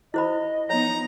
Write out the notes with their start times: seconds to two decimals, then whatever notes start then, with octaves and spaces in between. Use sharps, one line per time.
0.14 E4 C5 D#5 B5
0.70 F3 B3 D#4 C#5 A#5